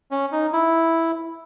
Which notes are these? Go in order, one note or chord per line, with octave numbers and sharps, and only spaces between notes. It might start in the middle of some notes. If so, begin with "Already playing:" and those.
C#4
D#4
E4